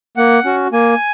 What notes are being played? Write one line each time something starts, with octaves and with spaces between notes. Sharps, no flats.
A#3 F#5
C#4 F#4
A#3 G#5